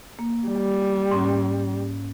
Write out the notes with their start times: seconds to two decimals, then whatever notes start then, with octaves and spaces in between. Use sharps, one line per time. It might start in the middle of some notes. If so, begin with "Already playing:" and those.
0.19 A#3
0.47 G3
1.12 G#2 C#4